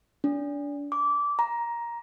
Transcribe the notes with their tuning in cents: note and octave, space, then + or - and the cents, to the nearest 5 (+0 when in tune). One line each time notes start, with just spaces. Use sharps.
D4 -30
D6 -20
A#5 +15